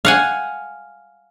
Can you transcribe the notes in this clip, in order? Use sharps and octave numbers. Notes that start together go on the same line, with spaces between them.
F5 F#5 G#5